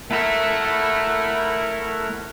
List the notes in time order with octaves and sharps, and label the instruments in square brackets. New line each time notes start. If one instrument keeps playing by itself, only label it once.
[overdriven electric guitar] A3 E5 [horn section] E4 A#4 F#5